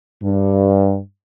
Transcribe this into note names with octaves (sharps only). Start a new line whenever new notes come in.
G2